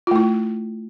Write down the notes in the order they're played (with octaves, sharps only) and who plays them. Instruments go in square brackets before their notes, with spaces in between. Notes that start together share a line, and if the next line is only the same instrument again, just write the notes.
[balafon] F4
A3
E4